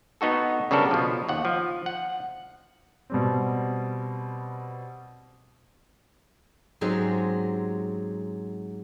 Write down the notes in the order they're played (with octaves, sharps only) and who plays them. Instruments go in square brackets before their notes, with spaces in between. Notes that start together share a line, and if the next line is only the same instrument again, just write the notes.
[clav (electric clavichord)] B3 D#4 F#4 A4
C#3 G3 B3 D4 A4 A#4
B2 F3
D#2 F#5
F3
F#5
[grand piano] B2 G3 C4
[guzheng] G#2 F#3 G#3 C4 C#4 G4